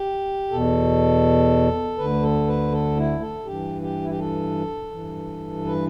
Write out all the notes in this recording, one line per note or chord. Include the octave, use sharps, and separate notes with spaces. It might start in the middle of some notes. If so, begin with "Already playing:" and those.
Already playing: G4
E2 B2 A4
D2 D3 B4
A4
B4
A4
E4
A4
G2 E3 G4
G4
E4
G4
A4
G2 E3
B4